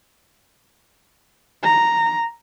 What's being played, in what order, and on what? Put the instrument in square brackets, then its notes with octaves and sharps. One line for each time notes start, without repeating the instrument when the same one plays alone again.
[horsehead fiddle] A#5